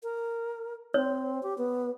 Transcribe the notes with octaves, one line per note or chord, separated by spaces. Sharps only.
A#4
C4 C#5
G4
B3